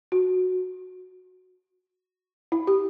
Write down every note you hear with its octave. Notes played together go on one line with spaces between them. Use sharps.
F#4
E4
G4